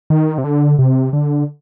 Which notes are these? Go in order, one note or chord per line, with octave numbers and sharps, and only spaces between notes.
D#3
C3
D3
C3
D3